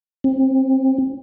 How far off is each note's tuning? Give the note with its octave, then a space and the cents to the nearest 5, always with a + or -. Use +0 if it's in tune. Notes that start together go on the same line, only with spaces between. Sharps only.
C4 +25